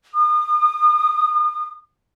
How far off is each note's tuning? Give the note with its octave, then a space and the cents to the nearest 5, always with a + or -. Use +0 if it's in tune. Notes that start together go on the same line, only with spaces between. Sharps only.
D#6 -40